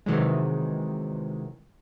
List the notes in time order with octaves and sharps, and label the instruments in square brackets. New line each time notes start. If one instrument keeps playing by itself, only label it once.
[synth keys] C3 D#3 E3 F#3 G#3